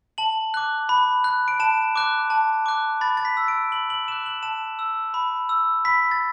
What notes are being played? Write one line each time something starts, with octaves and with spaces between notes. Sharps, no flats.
A5 F#7
D6 F#6
B5
F#6
D7
A5 E7
D6 F#6
A5
D6 F#6
B5 A6
A6
B6
E6
D7
B5 F#7
F#7
D6 F#6 E7
F#7
A5 E7
E6
B5
E6
B5 B6
A6